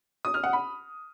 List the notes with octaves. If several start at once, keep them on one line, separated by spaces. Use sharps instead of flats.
D#6
F6
F#5
B5